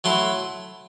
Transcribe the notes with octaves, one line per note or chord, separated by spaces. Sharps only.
F#3 A3 E4 C6